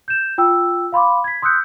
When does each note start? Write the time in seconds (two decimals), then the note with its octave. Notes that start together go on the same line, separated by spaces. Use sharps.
0.08 G6 E7
0.38 F4 G5 E6
0.92 F5 B5 C6 D6
1.24 G#6 B6
1.42 C6 D#6 E6 F#6 G6 C#7